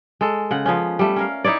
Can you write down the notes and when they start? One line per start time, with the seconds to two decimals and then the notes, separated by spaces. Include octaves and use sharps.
0.21 G#3 A4
0.51 C#3 F#5
0.66 F3 B3 C#4
0.99 G3 A3
1.16 C#4 A#4 F5
1.44 D#4 E4 C#5 D5